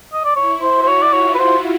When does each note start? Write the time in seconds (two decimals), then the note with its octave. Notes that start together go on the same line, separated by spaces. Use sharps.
0.13 D#5
0.24 D5
0.35 E4 C#5
0.62 C5
0.74 F#4
0.83 C5
0.87 C#5
1.02 D5
1.13 F4 C#5
1.34 B4
1.39 C5